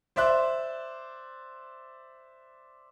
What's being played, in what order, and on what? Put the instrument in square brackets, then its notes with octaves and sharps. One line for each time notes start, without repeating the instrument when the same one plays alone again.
[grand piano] C5 D5 E5 C6 F#6